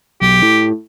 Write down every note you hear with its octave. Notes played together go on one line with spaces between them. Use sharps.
B1 G4
A2